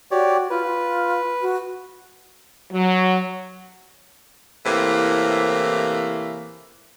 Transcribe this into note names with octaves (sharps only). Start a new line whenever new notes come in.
F#4 G4 C#5 D5
F4 B4
F4
F#4
F#3
A2 C3 E3 A#3